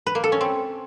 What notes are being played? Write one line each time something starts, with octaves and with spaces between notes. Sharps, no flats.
B4
A#3
A4
C#4
C4